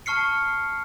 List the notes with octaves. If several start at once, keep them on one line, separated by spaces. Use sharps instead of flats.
A5 C#6 F6 C7 C#7